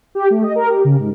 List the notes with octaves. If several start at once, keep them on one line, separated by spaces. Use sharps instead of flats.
G4
A3
D#5
A#4
G4
C#3
G#2